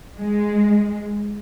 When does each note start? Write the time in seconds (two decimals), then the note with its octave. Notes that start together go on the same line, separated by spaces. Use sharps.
0.17 G#3